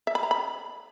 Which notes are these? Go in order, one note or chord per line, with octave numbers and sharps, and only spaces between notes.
E5
B5
A#5
B5